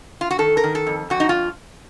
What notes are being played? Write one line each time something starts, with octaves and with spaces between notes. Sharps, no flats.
F4
F#4
D#3 A4
A#4
D#3
A4
F2
F2 F#4
D#4
F4